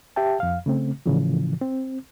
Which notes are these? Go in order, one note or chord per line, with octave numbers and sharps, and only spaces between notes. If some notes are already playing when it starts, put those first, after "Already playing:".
G4 E5 G5 A5
F2 F5
C#3 A3 C4
A2 C#3 E3 F3
C4